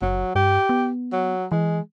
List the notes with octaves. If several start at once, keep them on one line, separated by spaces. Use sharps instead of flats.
F#1 F#3
G2 G4
B3
F#3
E3 G#3